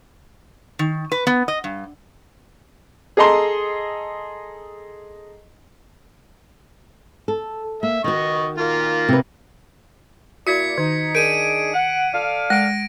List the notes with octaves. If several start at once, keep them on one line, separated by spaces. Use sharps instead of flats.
D#3
B4
B3
D#5
G2
G#4 A4 D#5 A#5 C6
A4
A#3 E5
D#3 F#4 D#5 C#6
A#3 F4
C3 B4
A#3 E4 F#4 D5 G#6 B6 C#7
D#3 D#4
D4 D#4 G#4 A#4 D7 D#7
F#5
A4 D5 F5
G#3 A#6 D7